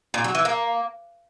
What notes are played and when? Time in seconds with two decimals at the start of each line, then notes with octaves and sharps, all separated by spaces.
0.14 A#2
0.24 F#3
0.35 E3
0.45 A#3